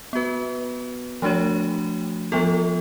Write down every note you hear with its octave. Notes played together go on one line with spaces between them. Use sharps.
B3 F#4 B4
F3 A3 D4 F#4 C#5
F3 B3 F4 A4